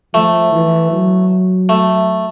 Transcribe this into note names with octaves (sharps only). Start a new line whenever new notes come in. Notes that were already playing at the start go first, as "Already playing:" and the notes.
F3 A3
E3
F#3
A3